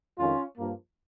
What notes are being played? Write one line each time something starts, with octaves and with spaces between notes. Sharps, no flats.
F2 D#3 G#3 C#4 F4
G2 F3 A#3